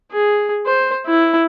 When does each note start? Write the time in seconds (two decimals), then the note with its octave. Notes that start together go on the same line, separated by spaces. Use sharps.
0.12 G#4
0.66 C5
1.06 E4